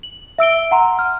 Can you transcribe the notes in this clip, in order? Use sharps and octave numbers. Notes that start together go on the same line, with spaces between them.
F#7
E5 E6 D7 G7
F#5 A#5 C6
F6